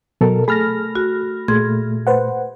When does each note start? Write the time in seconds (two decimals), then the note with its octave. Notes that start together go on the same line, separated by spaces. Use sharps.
0.21 B2 F#3 A4 A#4
0.48 A3 G#4 A4 B5 F6 A#6
0.95 F#4
1.48 A#2 A3 G#4 C6 G#6
2.07 B4 C5 F#5